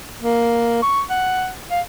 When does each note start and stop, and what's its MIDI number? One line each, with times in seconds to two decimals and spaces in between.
0.22 0.81 58
0.82 1.01 85
1.10 1.50 78
1.71 1.81 77